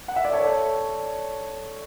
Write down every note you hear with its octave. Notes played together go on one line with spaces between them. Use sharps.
F#5
E5
D5
A4 C#5